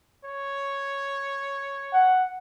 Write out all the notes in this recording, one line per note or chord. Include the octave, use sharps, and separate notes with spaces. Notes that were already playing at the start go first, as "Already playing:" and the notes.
C#5
F#5